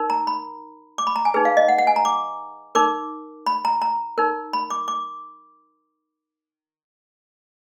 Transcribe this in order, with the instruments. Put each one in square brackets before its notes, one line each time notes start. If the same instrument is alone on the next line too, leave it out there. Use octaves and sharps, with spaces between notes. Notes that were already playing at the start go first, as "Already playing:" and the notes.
Already playing: [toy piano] D#4 A#4
A#5
B5
D6
B5
A#5
G#5
D#4 G#4 B4
F5
D#5
F#5
F#5
G#5
A#5
D6
D#4 A#4 D6
B5
A#5
A#5
D#4 A#4
B5
D6
D6